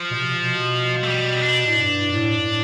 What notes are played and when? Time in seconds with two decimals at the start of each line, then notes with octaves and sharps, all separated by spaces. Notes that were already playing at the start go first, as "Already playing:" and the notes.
Already playing: F3
0.11 B2
0.15 C3
0.39 B2
1.04 A3
1.08 G3
1.36 C4
1.42 D4
1.67 A2
1.78 G2
2.12 A2
2.37 G2
2.48 A2